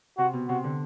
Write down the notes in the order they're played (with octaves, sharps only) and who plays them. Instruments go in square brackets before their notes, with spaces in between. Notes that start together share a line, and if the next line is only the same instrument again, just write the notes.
[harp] C3 [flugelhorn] F#4
[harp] B2
[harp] C3 [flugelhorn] F#4
[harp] D3